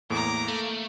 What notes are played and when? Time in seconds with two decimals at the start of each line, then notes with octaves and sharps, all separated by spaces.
0.10 E2 A2 A#3 A#5 D6
0.48 A3 A4